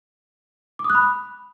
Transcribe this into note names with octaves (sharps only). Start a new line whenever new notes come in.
D6
D#6
F#6
B5